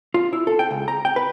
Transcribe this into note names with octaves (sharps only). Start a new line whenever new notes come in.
F4
E4
A4
G5
C#2
A#5
G5
B4